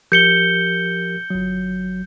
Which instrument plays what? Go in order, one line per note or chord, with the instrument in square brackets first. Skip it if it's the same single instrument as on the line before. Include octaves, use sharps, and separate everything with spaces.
[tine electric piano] F3 G4 A#4 [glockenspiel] G6 C#7 G7
[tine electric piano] G1 F#3